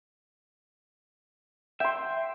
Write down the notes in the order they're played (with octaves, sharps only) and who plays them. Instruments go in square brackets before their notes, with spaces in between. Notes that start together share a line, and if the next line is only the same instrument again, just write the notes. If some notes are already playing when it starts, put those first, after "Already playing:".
[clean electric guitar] E5 [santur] G5 C6